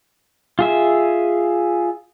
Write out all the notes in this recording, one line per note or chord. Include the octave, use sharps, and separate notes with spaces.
F4 G#4 E5